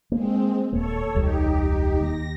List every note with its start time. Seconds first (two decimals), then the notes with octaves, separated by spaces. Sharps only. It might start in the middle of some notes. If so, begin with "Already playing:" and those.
0.12 G#3 A#3 C4
0.73 D#1 A#3 A4 C#5
1.15 E1 C#2 G3 D#4 G4
2.00 D#2 A#6